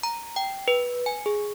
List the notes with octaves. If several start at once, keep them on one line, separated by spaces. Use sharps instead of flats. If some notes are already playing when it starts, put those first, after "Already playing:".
A#5
G5
B4
G#5
G#4